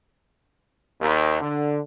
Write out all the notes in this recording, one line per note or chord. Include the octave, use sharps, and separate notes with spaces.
D#2
D3